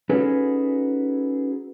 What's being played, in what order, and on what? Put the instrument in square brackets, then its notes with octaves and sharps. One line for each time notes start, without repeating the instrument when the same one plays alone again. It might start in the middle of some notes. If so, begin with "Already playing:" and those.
[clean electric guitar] C#4 D#4 F#4 G#4 A4 B4